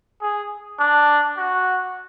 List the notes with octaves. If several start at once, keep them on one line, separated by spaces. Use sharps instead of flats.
G#4
D4
F#4